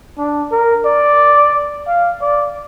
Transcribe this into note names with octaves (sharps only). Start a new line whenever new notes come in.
D4
A#4
D5
F5
D5